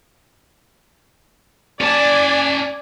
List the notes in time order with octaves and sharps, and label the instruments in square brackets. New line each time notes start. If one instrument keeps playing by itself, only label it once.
[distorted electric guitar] C#4 A5 [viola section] D5 G#5